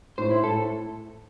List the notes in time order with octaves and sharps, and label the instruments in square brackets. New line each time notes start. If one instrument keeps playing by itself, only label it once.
[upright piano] A2 [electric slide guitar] C5
[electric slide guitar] E4
[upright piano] A2 [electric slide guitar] A4